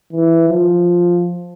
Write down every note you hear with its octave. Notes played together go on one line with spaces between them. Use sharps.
E3
F3